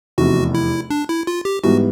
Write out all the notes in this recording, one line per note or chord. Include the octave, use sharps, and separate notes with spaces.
F1 E2 C3 F#4
E4
D4
E4
F4
G4
G#2 E3 G3 B3 F#4